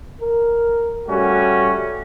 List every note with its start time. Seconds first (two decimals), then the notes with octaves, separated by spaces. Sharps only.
0.21 A#4
1.08 G3 A3 C#4 F#4